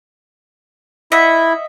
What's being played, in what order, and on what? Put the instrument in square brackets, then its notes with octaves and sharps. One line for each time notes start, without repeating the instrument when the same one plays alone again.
[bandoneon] E4 [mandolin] D#5 E5 F#5